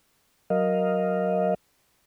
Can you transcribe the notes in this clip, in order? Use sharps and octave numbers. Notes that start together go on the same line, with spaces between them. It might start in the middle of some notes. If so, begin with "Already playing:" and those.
F#3 A#4 D#5 F5